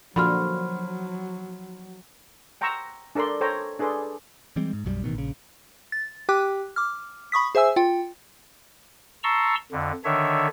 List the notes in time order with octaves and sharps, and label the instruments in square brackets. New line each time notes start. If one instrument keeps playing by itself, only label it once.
[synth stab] A#2 D3 [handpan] F3 F#4 [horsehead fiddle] F#3 [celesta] B5 C6 F6
[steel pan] F#5 G5 A#5 C6 C#6 E6
D4 A4 A#4 D5 C6
A4 C5 C#5 G5 A#5
D4 G#4 A4 B4 D5 C6
[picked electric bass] E3 G3 G#3 C4
G#2
B1 F#2 F3 G3
A1 B2 D#3
A#1 C#3
[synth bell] A6
G4 G5 D6 F#6
D6 F6
B5 C#6 D#6 B6
G#4 C5 E5 G#5 E6
F4 G5
[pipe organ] A5 A#5 C6 C#6 E6
F2 D3
D3 D#3 D4 C#5 E5